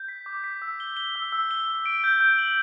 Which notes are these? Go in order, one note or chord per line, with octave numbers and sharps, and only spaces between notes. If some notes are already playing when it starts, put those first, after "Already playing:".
Already playing: G6
B6
D6
B6
E6
G7
G7
E6
E6
G7
E6
D7
G6
G6
F#7